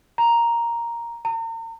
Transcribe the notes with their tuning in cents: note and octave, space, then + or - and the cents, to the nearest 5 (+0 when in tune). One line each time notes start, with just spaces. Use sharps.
A#5 +5
A#5 -40